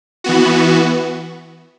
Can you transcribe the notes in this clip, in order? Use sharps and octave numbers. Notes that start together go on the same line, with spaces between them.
E3 B3 F#4